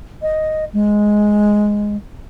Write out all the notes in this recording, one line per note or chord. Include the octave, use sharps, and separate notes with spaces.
D#5
G#3